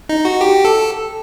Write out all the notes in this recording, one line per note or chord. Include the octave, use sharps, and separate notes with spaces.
D#4
F#4
G4
A4